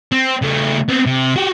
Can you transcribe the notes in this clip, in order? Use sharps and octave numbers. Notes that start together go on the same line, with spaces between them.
C4
C#3 A3
B3 C4
C3
F#4 G4